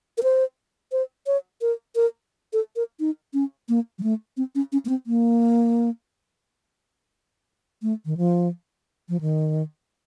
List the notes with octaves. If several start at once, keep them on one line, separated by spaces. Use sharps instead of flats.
A#4
C5
C5
C#5
A#4
A#4
A4
A#4
D#4
C#4
A#3
F#3
A3
C4
C#4
C#4
A#3
C4
A#3
A3
D#3
F3
F3
D#3